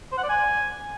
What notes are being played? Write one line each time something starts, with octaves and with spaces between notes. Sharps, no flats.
C5
F#5
D5
G#5